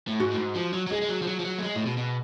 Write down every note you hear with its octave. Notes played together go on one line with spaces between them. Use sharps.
A2
G#2 F#4
A2
G#2
F3
F#3
F#3
G#3 G#4
G#3
F#3
F3
F#3
F3
F#3
A3
G#3
A2
B2
B2